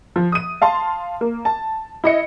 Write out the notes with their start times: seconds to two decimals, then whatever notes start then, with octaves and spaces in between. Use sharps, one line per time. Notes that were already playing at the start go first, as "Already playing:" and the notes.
0.16 F3
0.32 D#6 D#7
0.62 F5 A5 C6
1.21 A#3
1.45 A5
2.04 E4 D#5 C#7